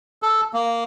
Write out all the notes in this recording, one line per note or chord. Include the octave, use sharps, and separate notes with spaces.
A4
A#3